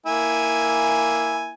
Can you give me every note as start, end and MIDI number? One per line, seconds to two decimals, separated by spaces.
0.06 1.52 58
0.06 1.52 64
0.06 1.52 80